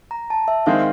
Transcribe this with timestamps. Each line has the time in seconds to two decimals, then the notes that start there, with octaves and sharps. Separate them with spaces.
0.11 A#5
0.30 A5
0.48 E5
0.66 D#3 G#3 C4 F5